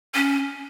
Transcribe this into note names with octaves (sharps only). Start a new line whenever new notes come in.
C#4